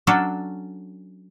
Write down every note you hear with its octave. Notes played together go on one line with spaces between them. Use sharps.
F#3 C#4 D4 A4